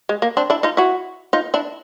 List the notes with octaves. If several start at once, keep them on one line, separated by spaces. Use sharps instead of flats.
G#3
A#3
C4 D4
D4 E4
D#4 F4
E4 F#4
D#4 F4
D4 E4